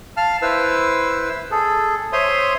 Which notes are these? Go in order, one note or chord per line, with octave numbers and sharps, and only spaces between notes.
F5 A5 F6
E4 B4 C5 E6
G#4 A4
C5 C#5 E5 C6 D#6